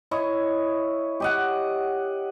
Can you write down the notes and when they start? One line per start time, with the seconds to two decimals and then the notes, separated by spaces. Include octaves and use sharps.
0.11 E4 C#5 D#5
1.20 G4 D#5 F#5